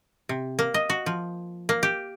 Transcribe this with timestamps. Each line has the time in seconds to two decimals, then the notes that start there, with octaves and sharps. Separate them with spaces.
0.29 C3
0.59 A#3
0.74 D#5
0.90 F#4
1.06 F3
1.69 A#3
1.83 G4